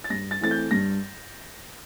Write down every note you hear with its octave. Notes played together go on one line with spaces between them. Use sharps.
A6
G2 A#6
A6
E3 A3 C4 A6
G6
G2 A#6